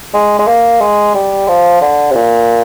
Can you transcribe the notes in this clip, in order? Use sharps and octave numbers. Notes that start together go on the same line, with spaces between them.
G#3
G#3
A#3
G#3
G3
F3
D3
C3
A#2